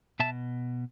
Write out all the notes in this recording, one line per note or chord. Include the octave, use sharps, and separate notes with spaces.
B2 E5 A5